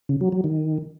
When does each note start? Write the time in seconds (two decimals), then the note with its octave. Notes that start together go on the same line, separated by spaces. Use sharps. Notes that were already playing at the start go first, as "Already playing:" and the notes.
0.09 C#3
0.21 F#3
0.32 F#3
0.44 D#3